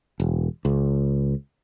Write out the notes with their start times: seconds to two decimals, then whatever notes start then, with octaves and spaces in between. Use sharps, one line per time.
0.20 E1
0.65 C#2